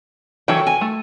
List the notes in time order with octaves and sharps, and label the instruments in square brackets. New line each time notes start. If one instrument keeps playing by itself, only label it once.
[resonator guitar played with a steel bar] E3 F#3 C#5 [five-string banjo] A4 G5
[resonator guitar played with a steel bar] G#5
[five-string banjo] A3